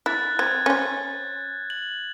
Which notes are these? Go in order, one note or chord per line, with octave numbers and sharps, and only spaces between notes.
E4 F#6 A6
C4 G#6
C#4 C5
F#7